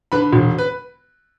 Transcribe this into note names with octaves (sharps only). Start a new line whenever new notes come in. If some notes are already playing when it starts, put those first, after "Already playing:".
D3 B4 B5
E1
B4